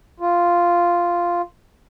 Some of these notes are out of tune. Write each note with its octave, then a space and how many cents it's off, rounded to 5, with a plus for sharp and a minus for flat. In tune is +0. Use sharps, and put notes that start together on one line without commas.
F4 -5